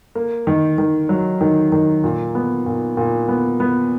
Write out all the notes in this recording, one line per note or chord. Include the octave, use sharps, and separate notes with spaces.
A#3
D#3
D#3
F#3
D#3
D#3
A#2
B3
A#2
A#2
B3
B3